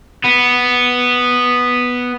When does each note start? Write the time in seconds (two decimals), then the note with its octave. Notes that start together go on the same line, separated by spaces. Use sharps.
0.24 B3